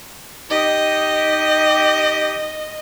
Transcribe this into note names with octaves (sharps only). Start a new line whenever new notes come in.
D#4 G4 D#5